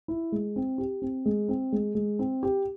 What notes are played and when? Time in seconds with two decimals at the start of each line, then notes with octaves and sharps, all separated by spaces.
0.08 E4
0.32 G#3
0.56 C4
0.78 G4
1.02 C4
1.26 G#3
1.49 C4
1.72 G#3
1.95 G#3
2.19 C4
2.43 G4